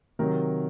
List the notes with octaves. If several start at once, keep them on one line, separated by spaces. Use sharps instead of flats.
C3 D#3 F#3 A#4